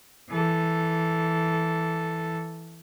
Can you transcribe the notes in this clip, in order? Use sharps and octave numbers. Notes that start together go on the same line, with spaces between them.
E3 A4